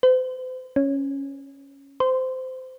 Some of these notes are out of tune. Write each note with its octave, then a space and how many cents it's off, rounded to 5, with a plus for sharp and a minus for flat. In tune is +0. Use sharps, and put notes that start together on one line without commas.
C5 -40
C#4 -5
C5 -20